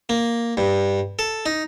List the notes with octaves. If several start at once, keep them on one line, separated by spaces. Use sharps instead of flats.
A#3
G2
A4
D#4